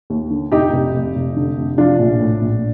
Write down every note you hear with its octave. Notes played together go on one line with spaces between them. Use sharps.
D#2
D3
F1 D#4 G4
F1
F1
F1
D3
F1
F3 D4 F4
A#1
A2
A#1